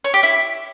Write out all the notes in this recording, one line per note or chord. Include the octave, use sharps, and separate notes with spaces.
C#5
G4
E4